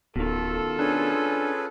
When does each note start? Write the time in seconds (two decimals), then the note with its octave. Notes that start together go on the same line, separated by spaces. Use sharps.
0.16 D1 B2 D#3 F4 A4
0.79 C#4 D4 G#4 B4